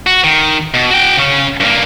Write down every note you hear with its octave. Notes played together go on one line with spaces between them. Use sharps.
F#4
D#3
B2
F#4 G5
C#3 C#4
G2 A#3